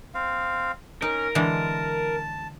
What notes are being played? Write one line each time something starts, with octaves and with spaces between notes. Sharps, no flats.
C4 F5
C#4 D#4 A#4
D3 E3 G#3 A5